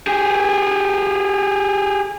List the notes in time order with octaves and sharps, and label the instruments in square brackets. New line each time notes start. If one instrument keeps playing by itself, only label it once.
[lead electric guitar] G4 G#4